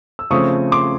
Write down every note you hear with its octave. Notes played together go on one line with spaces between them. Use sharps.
E6
C#3 F3 A3 C4 C#6 D#6
C6 D6